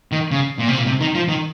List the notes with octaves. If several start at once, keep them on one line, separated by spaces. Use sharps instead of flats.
D#3
C#3
A#2
C3
A#2
C3
D#3
F3
D#3